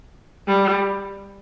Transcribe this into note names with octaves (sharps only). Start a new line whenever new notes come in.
G3